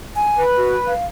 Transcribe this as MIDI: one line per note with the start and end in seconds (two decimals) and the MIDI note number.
0.16 0.43 80
0.38 0.93 71
0.57 0.76 66
0.87 1.06 77